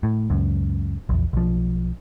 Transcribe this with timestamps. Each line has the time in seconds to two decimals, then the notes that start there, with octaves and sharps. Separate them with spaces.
0.03 A2
0.30 C#2 F#2
1.09 A#1 E2
1.33 B1 F3